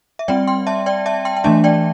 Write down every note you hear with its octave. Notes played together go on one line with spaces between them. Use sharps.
E5
G3 C4 D5 G5
G5 C6
E5 A5
D5 G5
E5 A5
G5 C6
G5
E3 A3 D4 E5 A5
D5 G5